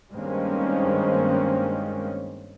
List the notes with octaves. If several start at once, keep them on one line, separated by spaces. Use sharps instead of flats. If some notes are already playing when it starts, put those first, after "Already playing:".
G2 D#3 G#3 A#3 C4 C#4